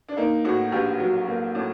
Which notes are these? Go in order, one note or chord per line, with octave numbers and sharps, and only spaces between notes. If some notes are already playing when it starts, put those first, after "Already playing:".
D4
A#3 D#4
A2 F#4
A#1 G4
F#3
A#3
A2